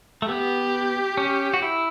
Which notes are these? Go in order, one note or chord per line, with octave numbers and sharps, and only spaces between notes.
A3
B3 G4
C#4
F#4
E4